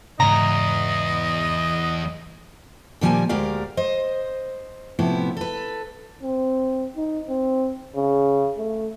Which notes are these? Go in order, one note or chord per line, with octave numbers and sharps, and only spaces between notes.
E2 G#2 C#3 D#5 A#5
A#2 D#3 F3 G3 A#3 G#5
D2 G#3 G4 A#4 D5 F5
C5 D#5
A2 C3 F3 B3 E4
A4 B4
C4
D#4
C4
C#3
A3